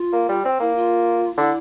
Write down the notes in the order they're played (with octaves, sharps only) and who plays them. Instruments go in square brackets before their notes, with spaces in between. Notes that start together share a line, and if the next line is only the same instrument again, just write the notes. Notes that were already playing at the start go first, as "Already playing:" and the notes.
Already playing: [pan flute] F4
[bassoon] A#3
G3
C4
[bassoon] A#3 [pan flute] E4
[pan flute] F4
[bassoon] D3 [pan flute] E4